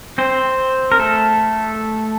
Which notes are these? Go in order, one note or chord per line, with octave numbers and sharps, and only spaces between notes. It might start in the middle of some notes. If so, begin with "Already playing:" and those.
C4 C5
A#4
A3 A4